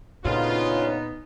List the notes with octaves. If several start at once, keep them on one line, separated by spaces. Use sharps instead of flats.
D2 A#2 C#3 B3 D#4 F4